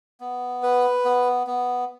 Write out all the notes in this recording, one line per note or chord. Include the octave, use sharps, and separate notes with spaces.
B3
B4
B3
B3